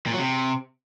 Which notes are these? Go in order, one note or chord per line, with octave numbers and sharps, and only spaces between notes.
A#2
F#3
C3